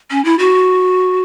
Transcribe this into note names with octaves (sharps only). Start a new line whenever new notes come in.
C#4
E4
F#4